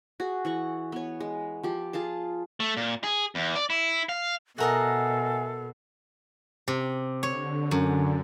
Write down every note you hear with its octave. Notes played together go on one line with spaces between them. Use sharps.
F#4 G#4
E3 F#5 C#6
B3 C#5
G#3
F3 G4
F4 G#4 F5 A5
A3
A#2
G#4
E2
D5
E4
F5
B2 F#4 A4 A#4 D#5 E5 F#5 G#5
C3
D3 C#5
F#2